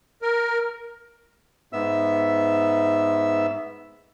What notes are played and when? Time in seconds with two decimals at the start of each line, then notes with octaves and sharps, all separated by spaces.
0.22 A#4
1.73 G#2 B3 E5 E6